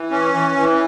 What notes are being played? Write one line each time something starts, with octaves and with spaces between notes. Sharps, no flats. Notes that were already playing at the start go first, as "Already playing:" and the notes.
Already playing: E3
C#4
E3
E3